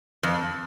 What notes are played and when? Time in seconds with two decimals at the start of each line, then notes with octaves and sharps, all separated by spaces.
0.23 F2